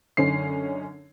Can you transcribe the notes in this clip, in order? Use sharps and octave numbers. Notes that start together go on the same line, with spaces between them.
F#2 D3 C#4 D#4 C7